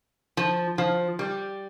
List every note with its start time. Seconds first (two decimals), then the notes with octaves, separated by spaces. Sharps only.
0.37 F3
0.78 F3
1.19 G3